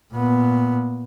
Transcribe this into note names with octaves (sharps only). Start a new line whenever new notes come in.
A#2 B3